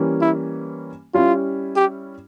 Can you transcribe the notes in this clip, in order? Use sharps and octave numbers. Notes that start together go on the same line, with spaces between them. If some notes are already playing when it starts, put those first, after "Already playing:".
Already playing: E3 G3 A#3 C#4
E4
G3 C#4 E4 F4
G4